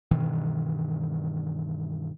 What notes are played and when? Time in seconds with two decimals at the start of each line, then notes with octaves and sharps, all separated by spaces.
0.11 G2 B2 D#3 E3